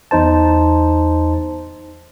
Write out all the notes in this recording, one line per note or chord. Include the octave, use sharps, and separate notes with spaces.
E2 D#4 C5 A5